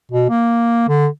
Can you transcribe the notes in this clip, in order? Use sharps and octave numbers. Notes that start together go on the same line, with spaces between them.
B2
A#3
D3